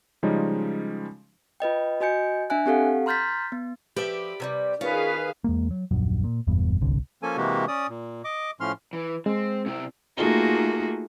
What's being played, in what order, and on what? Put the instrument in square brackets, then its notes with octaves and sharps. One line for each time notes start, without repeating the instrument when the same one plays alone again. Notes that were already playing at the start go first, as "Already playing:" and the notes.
[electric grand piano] C#3 F3 G3 G#3 C#4 D#4
[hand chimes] F4 B4 D#5 G5
F#4 D#5 G#5 G6 C#7
D4 E5 G#5 F#6
C4 G4 A4 F5 F#5
A#5 C6 F6 G6 A6 B6
B3
[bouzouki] F3 E5 [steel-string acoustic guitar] G4 B4 D5
[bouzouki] C3 F#3 G3
[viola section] D#3 G#4 F5 [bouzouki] C#4 [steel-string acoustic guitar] F4 [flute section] B4
[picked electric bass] E2 G#3 A#3
F#3
D#1 A#1 F#2
A#2
F#1 E2 G2 B2
D1 G1 C2 D3
[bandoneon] F3 A#3 C#4 A4 G#5
C3 E3 G#3 A#3 F#4 G4
C#4 D5 D#6
A#2
D#5 D6
A2 F3 C#4 C6 F6
[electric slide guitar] E3
[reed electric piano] G#3 [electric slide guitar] C4
[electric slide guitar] C3 E4 G4
[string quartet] A3 A#3 D#4 F4 F#4 G#4